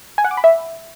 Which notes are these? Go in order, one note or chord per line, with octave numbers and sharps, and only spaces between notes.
G#5
F#5
D6
B5
E5